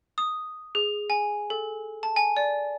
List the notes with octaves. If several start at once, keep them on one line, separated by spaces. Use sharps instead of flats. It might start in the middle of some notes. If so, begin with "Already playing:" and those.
D#6
G#4
G#5
A4
A5
G#5
D5